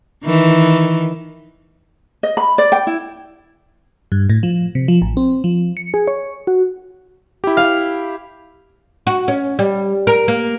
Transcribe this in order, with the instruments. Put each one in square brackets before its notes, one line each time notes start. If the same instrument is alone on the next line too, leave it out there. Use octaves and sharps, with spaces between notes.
[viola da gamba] D#3 E3
[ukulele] D#5
B5
D5
G5
E4
[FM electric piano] G2
A2
F3
C3
F3
A1
C4
F3
C#7
G#4
C#5
F#4
[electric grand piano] E4 G4
[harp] F5
[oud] F#4
C#4
G3
A#4
A#3